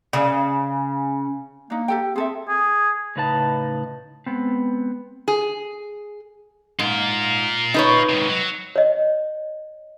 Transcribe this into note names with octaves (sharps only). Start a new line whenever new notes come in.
C#3
A#3 D4 D#4
G4 A4 G5
C4 G#4 A4 E5
G#4
A2 C#3 D#4 B4 D5 A5
G#3 B3 C4
G#4
G#2 F4 A#4
D#4 B4 C#5
G#2 C3
F#3
C#5 D#5